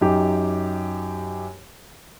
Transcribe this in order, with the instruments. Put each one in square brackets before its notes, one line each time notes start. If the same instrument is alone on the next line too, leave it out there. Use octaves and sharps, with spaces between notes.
[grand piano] F#2 D#4 G4